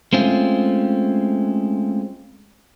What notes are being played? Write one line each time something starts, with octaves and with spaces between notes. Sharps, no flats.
G#3 A3 C4 C#4 F4